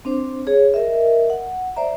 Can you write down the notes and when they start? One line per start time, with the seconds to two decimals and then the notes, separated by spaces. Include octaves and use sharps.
0.05 C4 D4 C5
0.47 G#4 C#5
0.74 A#4 D#5 E5
1.30 F#5
1.76 C5 D5 E5 A#5